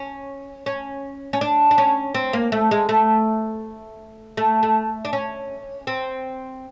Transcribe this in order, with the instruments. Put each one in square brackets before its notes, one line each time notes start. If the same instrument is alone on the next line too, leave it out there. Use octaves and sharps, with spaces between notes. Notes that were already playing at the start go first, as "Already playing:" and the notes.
Already playing: [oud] C#4
C#4
C#4
D4
D4
C#4
C4
A#3
A3
G#3
A3
A3
A3
D4
C#4
C4